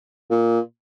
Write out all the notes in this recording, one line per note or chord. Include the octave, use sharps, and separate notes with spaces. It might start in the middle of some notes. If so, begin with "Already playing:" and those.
A#2